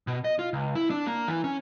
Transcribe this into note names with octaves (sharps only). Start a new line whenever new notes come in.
B2
D#5
F4
C#2
E4
D4
A#3
E3
C#4